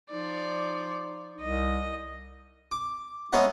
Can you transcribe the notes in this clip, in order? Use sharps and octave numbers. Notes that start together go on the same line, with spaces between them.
F3 D#4 D5
C2 D#5
D6
G#3 B3 C#4 A#4 E5 F#5